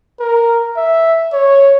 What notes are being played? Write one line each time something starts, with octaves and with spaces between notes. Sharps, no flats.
A#4
E5
C#5